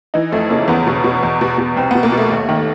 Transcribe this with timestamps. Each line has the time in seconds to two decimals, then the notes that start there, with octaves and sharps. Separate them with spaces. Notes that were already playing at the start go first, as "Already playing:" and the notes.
0.14 E3 D#4
0.32 F2 A3
0.50 C#3 A#3
0.68 E2 B3
0.87 B2
1.04 B2
1.23 E2
1.41 B2
1.58 B2
1.76 C2 C4
1.91 B2 B3
2.03 A#3
2.12 B2
2.18 A3
2.30 D#2
2.49 D#3